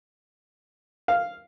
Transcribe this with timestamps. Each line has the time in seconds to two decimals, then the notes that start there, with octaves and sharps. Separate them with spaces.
1.08 F5